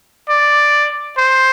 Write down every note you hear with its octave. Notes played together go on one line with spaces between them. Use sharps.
D5
C5